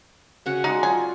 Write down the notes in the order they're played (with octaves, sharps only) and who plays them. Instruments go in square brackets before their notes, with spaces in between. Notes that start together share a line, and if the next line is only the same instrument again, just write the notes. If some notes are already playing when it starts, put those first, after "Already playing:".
[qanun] C#3 F#4 F#5
[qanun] G#3 F#4 D5 [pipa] D#4
[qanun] F#3 F4 [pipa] G#5